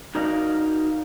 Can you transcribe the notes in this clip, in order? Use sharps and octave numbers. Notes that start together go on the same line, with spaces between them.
D#4 F#4 A#4 D5 D#5 F5